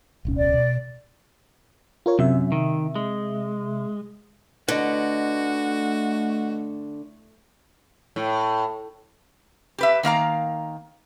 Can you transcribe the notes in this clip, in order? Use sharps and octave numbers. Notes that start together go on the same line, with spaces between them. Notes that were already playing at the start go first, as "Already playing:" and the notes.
D1 B1 C#4
D5
B2
F4 A#4 C#5
F#2 C3 E5
D#3
G#3
D3 A3 F#4 B4 D#5
A2
G4 B4 E5
D#3 A#3 F5 A#5